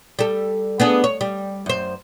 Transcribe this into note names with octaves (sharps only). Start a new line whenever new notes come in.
G3 A4
B3 D4 G#4
C#5
G3
F#2 C5